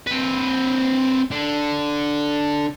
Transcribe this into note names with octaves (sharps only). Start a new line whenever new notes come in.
C4 B4
D3